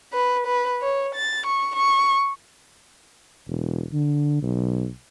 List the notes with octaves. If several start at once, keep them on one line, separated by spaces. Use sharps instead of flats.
B4
B4
C#5
A6
C#6
C#6
E1
D3
B1